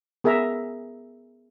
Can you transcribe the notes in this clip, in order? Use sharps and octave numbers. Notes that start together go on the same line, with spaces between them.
B3 G#4 A#4 E5 A#5